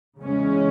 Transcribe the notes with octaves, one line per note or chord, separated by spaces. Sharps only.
E2 C#3 G#3 C#4